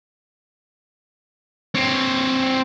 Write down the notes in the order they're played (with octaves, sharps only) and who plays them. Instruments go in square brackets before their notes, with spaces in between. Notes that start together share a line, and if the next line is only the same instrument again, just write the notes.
[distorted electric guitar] C4 C#5